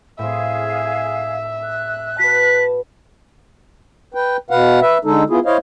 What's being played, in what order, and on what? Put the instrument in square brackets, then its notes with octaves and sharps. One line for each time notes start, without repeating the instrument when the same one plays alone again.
[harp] A2 C4 [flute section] G#4 F5 [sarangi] E5
[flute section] F#6
[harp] F#4 B4 [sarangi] A5 [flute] B6
[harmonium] B4 G5
B2 B4 F5 F#5
B4 E5
D3 G#3 D#4 A4
B3 E4 F4 G#4
E4 C5 C#5 D#5 F5